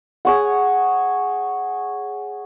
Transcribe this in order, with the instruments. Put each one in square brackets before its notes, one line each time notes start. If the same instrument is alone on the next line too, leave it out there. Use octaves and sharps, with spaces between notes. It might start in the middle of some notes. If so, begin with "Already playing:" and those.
[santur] G#4 C#5 F#5